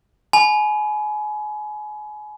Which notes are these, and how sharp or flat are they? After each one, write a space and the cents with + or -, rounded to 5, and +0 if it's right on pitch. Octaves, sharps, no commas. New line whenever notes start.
G#5 +30 B5 +0